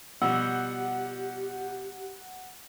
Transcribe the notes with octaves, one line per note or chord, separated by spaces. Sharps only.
B2 F3 G3 G4 F#5 E6